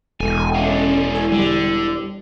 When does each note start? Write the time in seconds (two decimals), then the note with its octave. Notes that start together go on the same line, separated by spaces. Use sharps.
0.20 E1 A4 G#5
0.55 G#3 C#4 D4
1.15 E4 G#5
1.32 D3 G3